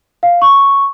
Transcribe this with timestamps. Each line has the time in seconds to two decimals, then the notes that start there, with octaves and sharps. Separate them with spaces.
0.23 F5
0.42 C#6